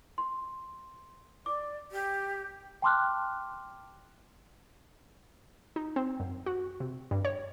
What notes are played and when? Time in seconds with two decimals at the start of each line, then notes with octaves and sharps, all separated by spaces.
0.18 C6
1.46 D5 D6
1.91 G4
2.82 G5 A5 C6 D6 F6 F#6
5.76 D#4
5.96 C4
6.20 F#2
6.46 F#4
6.80 C3
7.11 G2
7.25 C#5